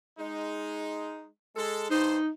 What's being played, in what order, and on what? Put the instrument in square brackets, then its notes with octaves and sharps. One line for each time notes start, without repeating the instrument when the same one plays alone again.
[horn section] G#3 D#4
G#3 A4
[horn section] G2 C5 [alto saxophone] D#4